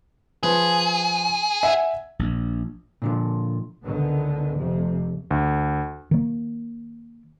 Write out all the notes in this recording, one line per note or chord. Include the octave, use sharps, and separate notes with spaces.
F3 G#4 B4
E5 F#5 G#5
A#1
A#2 D3 F3
C#2 D3 D#3 B3
F1 F2 C3
D2
D#3 A#3